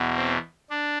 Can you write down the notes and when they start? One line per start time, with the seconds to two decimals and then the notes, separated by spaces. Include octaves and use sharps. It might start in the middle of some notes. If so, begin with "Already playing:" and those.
Already playing: E2 B2
0.17 C4
0.70 D4